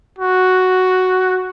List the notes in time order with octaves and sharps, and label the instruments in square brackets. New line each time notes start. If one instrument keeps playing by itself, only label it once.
[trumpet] F#4